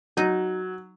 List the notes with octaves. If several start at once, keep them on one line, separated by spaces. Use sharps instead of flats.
F#3 D#4